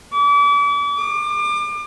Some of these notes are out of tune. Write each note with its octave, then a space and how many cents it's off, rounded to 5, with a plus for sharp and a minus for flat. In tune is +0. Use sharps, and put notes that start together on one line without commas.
D6 -40
D6 +35